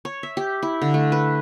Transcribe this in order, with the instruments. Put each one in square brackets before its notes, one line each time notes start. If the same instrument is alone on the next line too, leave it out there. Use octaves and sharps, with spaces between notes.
[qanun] C#5
E5
G4
E4
D3
A3
B4